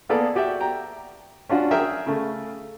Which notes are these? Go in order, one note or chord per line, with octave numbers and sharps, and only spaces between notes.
A#3 B3 G#4 A4 D5
F#4 G4 D5 E5 G5
G5 A#5
C#4 D4 F4 F#4
G#4 A#4 E5 G5
C#3 A3